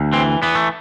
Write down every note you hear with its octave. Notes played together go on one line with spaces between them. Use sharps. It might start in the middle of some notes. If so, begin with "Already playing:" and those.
Already playing: D2
E3 C4
E3 B3
A3